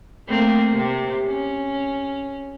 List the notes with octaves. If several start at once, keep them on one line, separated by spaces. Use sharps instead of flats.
A3 A#3 C4
C3
C#4